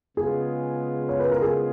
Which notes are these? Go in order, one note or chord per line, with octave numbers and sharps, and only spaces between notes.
C#3 G#3 B3 F4 G#4
C#5
B4
A#4
G#4